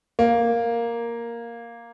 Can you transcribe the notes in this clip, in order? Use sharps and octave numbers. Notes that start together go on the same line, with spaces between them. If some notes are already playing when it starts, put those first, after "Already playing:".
A#3